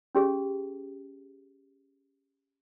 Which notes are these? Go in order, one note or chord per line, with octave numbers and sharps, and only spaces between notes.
C#4 G4 G#4